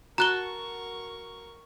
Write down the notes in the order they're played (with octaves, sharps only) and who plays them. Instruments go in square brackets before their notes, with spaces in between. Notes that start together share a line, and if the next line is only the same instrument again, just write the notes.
[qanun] F#4 A5 [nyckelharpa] A#4 C#6 [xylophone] A#5 F#6 G7